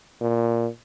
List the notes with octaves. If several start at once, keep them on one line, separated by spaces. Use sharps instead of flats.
A#2